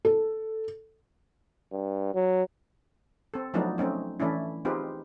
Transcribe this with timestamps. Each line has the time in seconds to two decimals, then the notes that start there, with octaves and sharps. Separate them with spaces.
0.05 A4
1.72 G2
2.15 F#3
3.34 C4 A4
3.54 F3 F#3 A3 B3 D4 D#4
3.78 A3 C4 C#4 D#4
4.20 E3 A3 C#4 D4 E4
4.65 C4 D#4 F4 G4 G#4 B4